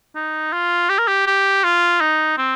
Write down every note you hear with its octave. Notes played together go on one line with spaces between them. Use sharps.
D#4
F4
G4
A#4
G4
G4
F4
D#4
C4